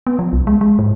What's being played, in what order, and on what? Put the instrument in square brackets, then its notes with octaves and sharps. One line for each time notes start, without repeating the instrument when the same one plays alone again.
[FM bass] B3
F3
C2
G#3
G#3
G#2